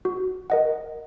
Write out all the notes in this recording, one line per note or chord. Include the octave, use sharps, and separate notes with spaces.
F#4
A#4 D#5 F#5